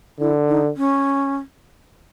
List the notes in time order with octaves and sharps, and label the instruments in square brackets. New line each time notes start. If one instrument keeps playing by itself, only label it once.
[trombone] D3 [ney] E4
[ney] D#4
C#4